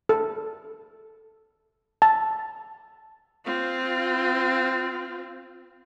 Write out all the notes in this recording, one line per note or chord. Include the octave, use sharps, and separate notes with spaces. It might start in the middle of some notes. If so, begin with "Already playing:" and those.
A4
A5
C4 F4